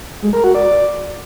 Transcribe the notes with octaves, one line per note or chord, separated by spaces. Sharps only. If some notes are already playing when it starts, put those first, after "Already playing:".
G#3
A#4
F#4
D5